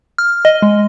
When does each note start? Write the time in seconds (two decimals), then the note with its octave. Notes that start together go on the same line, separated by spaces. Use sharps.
0.18 F6
0.45 D#5
0.62 G#3